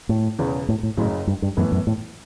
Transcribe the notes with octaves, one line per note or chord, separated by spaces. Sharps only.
A2
E1 E2 C#3
A2
A2
F#1 F#2 A2 C#3
G2
G2
F#2 A2 E3 B3
F#2
A2